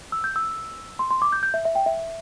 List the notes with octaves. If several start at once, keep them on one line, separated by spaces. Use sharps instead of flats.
E6
G6
E6
C6
C6
D6
G6
G6
E5
E5
G5
E5